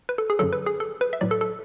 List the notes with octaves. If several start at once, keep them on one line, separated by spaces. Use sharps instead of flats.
B4
A4
G#4
F#2 D3 F#3 A4
B4
G#4
A4
B4
E5
A2 F#3 D5
A4
A4